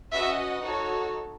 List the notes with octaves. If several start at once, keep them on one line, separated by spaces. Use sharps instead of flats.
C#4 F#4 B4 D#5 E5 F#5
D#4 F#4 A4 C#5